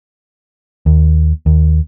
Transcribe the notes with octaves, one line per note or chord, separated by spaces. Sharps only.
D#2
D#2